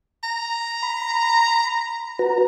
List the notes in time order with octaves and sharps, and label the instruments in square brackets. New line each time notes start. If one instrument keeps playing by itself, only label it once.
[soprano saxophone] A#5
[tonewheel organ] B5
F#4 B4 A#5